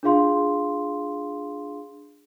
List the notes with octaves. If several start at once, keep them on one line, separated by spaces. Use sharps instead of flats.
D4 F4 G#4 F5 C6